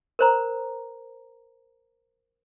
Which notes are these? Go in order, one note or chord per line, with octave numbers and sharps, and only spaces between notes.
A#4 C5 A#5